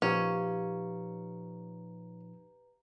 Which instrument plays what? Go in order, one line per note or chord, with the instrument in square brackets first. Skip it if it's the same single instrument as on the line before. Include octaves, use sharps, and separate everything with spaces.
[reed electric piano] A#2 F3 D#4 [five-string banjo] C#4 [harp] G4 F5 [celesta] B4 A#5